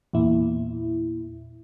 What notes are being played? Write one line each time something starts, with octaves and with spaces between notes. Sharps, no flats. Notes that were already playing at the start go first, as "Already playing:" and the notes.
E2 A#2 E4